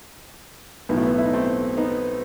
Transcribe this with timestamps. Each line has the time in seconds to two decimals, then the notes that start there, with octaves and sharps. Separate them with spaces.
0.89 B1 A2 E3 B3
0.98 A3
1.07 B3
1.18 E4
1.25 D#4
1.33 A3 C4
1.77 B3 D#4